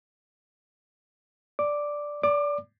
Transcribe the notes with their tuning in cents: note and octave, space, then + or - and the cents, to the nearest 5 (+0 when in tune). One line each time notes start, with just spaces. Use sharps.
D5 +0 D6 +0
D5 -20 D6 +25